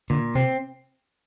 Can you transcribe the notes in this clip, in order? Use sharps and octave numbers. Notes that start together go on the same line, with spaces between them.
A#2 D3
C3 C4